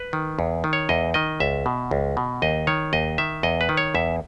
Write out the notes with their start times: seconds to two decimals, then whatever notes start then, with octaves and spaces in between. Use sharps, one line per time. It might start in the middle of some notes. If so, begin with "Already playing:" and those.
Already playing: B4
0.13 D#3
0.39 E2
0.64 D#3
0.73 C#5
0.89 E2 D#5
1.14 D#3 D#5
1.40 C#2 E5
1.66 B2
1.91 C#2
2.17 B2
2.42 D#2 D#5
2.67 D#3 C#5
2.93 D#2 D#5
3.18 D#3 E5
3.43 E2 D#5
3.61 B4
3.69 D#3
3.77 C#5
3.95 E2 E5